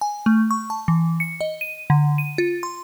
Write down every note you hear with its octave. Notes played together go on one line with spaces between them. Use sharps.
G#5
A3
C#6
A5
E3
C#7
D#5
D#7
D3
D#7
F4
C6